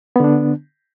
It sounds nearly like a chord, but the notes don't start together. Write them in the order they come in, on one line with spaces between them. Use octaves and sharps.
B3 D3 D4